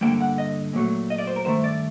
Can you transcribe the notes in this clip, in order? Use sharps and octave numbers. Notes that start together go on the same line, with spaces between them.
G2 D3 G3 A#3 G5
F#5
D#5
A#2 F#3 A3
D#5
D5
C5
A#4
G2 D#3 A3 C5
D5